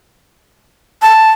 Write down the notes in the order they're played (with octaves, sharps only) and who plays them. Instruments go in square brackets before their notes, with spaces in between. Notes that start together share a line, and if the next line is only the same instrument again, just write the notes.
[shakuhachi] A5